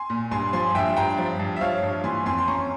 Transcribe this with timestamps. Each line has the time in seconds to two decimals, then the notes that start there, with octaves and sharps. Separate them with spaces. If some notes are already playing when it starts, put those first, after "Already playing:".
Already playing: G#5 C6
0.10 A#2
0.31 G2 G#5 C6
0.53 F3 G#5 C6
0.75 G2 E5 G5
0.96 G2 G5 A#5
1.18 F3
1.39 G2
1.56 E5
1.61 F3 C#5 F5
1.83 G2
2.04 E3 G#5 C6
2.26 F2 G#5 C6
2.38 C6
2.48 C#4 A#5 C#6